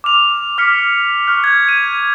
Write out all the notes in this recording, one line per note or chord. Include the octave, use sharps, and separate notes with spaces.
D6 F6 F7
D6 F6 B6 C#7
C#6 F6 F#6
G#6
D#7